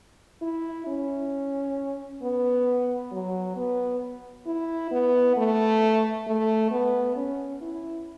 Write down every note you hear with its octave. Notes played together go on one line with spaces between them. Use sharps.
E4
C#4
B3
F#3
B3
E4
B3
A3
A3
B3
C#4
E4